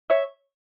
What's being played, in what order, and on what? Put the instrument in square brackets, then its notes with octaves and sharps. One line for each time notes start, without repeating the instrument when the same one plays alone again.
[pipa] C#5 E5